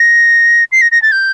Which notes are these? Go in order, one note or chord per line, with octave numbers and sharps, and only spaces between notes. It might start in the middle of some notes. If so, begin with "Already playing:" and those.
Already playing: A#6
C7
A#6
A#6
A6
G6